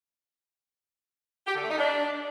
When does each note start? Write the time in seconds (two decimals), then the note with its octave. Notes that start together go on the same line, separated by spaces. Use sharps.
1.47 G4
1.55 D3
1.62 A3
1.70 D#4
1.78 D4